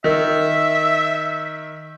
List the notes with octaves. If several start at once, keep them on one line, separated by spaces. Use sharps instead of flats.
D#3 E5